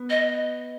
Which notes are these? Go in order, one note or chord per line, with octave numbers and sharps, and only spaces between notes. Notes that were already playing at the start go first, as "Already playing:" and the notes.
Already playing: B3
D#5